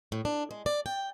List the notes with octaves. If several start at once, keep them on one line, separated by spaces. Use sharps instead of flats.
A2
D4
G#3
D5
G5